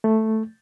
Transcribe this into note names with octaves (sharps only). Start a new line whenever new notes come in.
A3